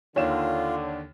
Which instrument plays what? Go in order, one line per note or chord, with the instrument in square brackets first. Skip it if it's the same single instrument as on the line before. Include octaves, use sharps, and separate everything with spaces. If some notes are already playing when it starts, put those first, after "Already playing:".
[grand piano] D#2 D#3 E7 [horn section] D3 [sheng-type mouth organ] F4 [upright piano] C#5